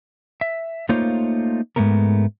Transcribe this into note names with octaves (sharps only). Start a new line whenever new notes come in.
E5
A3 A#3 D#4 F4 C5 C#5
G#2 B2 G#3 A3 B3 A#4